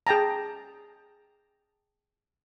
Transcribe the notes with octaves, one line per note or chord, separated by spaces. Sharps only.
G#4 G5 A5 A#5